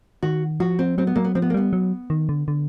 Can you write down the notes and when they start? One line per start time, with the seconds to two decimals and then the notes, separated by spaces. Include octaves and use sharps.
0.22 D#3 F#4
0.60 F3 F#4
0.79 C4
0.98 F#3 C4
1.07 B3
1.16 F#3 A#3
1.24 B3
1.35 F3 C4
1.42 B3
1.50 A#3
1.54 G3 B3
1.73 F#3
2.10 D#3
2.29 D3
2.48 D3